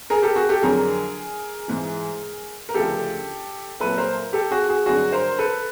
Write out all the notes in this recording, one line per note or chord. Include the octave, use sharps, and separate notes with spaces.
G#4 A#4
G4 A4
F#4 G#4
G4 A4
F2 D3 F#3 G#4 A#4
G#2 E3
A#4
D2 C#3 F3 G4 A4
C2 A#2 F#3 A4 B4
A#4 C5
G4 A4
F#4 G#4
F#4 G#4
G2 D3 F#3 F#4 G#4
A#4 C5
A4 B4